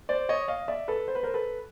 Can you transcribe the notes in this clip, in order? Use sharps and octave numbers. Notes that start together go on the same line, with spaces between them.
C5 D5
C#5 D#5
D#5 F5
D5 E5
A4 B4
C5
B4
A#4 C5
A4 B4